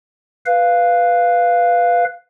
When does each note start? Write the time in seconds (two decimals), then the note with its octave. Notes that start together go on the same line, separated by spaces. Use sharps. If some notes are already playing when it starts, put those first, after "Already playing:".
0.46 B4 F5